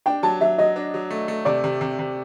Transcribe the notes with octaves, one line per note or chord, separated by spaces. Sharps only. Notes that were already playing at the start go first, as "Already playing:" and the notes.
D4 G5
F#3 A5
F#3 E5
F#3 D#5
D4
F#3
A3
A3
C3 D5
C3
C3
C3